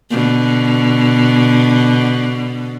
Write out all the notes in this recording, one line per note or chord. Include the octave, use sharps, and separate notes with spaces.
B2 D3